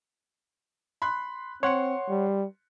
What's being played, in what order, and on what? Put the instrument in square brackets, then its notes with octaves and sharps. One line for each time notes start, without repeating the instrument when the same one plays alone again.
[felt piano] B5 C6 F#6
[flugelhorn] C4 [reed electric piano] C#5 F#5 [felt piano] C6 C#7
[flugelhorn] G3